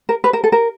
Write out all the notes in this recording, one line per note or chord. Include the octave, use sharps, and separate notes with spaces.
A#4
B4
A#4
A4
A#4